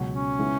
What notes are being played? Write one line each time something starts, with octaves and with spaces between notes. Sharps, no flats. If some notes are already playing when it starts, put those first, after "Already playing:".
Already playing: C#2 B2 F#3
C#4
C#3 G#3 B3 E4